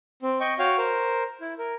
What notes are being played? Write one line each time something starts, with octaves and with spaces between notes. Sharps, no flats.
C4
D#5 G5 C#6
F#4 C#5 F5 G5
A#4 C5
E4
A#4